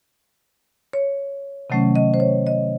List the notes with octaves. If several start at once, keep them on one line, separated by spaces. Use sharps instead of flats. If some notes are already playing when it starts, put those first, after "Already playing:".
C#5
C3 D#3 F#3 A3 C#4
D#5
C5
C#5
D#5